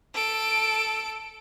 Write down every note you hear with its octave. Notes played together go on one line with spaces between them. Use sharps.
A4 D7